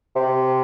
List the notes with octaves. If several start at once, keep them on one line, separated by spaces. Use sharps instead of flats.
C3